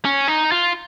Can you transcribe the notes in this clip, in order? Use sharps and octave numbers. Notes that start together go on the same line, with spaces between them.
C#4
D#4
F4